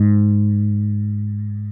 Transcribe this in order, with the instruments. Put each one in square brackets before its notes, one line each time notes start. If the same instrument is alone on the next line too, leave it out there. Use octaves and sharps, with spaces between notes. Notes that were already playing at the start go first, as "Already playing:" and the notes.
Already playing: [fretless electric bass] G#2